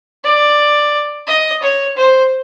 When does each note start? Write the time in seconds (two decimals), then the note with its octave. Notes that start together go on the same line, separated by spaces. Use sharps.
0.24 D5
1.27 D#5
1.62 C#5
1.97 C5